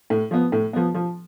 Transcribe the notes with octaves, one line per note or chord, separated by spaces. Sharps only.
A2
F3 B3
A2
F3 B3
F3